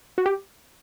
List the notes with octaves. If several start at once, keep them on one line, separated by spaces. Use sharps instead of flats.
F#4
G4